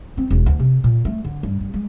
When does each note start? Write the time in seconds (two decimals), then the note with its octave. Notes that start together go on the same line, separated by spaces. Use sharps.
0.17 C4
0.31 E1
0.46 D2
0.59 C3
0.84 A#2
1.05 A3
1.25 D3
1.43 G2
1.61 G2
1.74 G#3